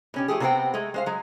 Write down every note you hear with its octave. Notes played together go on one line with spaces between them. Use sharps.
B2 C#4 G4
F3 A3 G4 G#4
C3 B3 C4 C5 F#5 G5
G#3 A3
G#3 C5 F5
F#3 G#3